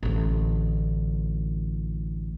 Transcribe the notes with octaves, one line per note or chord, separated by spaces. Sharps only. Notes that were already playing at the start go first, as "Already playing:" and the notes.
A1 D2